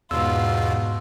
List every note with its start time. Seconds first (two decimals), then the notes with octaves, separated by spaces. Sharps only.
0.11 E2 G#2 B2 B3 F4 E6